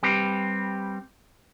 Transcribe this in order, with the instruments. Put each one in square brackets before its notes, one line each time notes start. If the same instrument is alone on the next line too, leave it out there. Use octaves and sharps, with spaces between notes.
[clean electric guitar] G3 C4 G4 B4